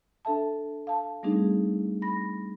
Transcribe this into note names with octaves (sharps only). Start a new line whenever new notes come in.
D4 A4 E5 A5
F5 A5
G3 A3 C4 D4 D#4 G#4
B5 A#6